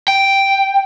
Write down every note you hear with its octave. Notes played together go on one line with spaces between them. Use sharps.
G5